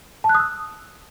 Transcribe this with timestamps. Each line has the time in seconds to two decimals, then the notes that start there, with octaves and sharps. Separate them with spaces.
0.24 A5
0.29 F#6
0.35 D#6
0.40 E6